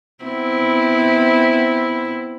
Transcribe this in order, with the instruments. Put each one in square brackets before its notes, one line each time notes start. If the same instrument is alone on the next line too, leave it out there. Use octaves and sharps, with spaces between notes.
[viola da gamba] B3 C4 E4